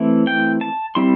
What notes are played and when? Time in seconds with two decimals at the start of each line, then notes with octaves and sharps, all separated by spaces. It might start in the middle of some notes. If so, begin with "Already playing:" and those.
Already playing: E3 A3 C4 E4
0.27 G5
0.61 A5
0.95 G3 C4 E4 C6